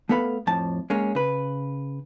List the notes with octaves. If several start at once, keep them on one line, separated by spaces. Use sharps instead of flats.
A3 B3 A4 B4 F5 B5
F2 A2 A5
G#3 A#3 C#4
C#3 B4